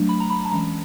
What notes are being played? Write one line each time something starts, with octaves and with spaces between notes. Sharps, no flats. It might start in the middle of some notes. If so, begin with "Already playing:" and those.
Already playing: F#3 A3 D4
B5
A#5
B5
A5
E3 G#3 C#4 A#5